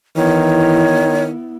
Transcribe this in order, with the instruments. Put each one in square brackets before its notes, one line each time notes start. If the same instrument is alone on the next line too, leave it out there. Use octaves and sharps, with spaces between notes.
[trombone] D#3 [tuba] E3 [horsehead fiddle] B3 E4 [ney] C#5